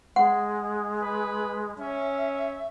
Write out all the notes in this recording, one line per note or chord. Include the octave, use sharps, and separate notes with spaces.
G#3 F#5
B4
C#4 E5